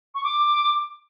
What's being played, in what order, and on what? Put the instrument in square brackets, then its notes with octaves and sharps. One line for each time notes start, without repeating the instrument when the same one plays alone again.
[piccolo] C#6
D6